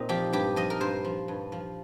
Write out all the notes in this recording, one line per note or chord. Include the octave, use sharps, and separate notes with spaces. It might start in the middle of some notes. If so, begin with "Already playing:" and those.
Already playing: A#2 C4 D#4
F3 G4
G2 G4
F3 D#5
A#4
G2 C5
F3
G2
F3